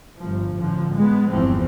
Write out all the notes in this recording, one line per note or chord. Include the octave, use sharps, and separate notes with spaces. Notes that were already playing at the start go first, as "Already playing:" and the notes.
G1 F3
A1 D3 F3
G#3 B3
G1 E2 E3 F3 C4